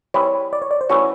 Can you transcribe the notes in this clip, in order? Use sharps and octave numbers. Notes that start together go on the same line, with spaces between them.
G3 C4 E4 G#4 B4 C#5
D5
C#5
D5
C5
E3 A3 C#4 F#4 C#5